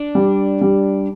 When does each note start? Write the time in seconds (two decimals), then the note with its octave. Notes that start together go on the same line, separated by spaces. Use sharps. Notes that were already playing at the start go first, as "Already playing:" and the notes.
Already playing: D4
0.15 G3
0.61 G3